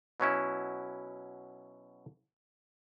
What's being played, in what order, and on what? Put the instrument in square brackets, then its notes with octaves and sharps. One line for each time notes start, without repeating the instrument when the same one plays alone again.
[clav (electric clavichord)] B2 F#3 C#4 E4